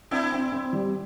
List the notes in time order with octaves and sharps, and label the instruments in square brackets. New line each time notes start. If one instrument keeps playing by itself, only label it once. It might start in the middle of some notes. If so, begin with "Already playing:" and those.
[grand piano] C4 [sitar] D4 E4
[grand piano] C4
C4
G3